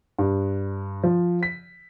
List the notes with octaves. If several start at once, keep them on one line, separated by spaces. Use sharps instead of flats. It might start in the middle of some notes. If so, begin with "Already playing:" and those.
G2
F3
B6